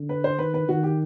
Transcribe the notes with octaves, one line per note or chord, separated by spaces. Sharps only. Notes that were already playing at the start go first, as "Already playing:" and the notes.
Already playing: D3
B4
C5
D#3 B4
B4
D#3 F#4
G4